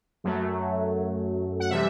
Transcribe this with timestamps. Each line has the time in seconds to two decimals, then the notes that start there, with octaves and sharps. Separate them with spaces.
0.24 F#2 F#3 A3
1.60 F#5
1.70 C3 E3 G3 E5